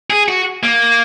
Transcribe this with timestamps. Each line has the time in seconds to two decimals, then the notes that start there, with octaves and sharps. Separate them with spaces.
0.10 G#4
0.28 F#4
0.63 A#3